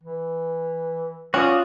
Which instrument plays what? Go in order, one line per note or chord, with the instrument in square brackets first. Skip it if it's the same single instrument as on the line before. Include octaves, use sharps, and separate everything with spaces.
[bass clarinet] E3
[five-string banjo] C#4 [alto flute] F4 [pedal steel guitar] F#4 D5 D#6